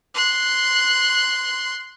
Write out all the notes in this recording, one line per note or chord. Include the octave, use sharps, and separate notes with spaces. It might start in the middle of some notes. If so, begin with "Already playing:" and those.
C6 F#6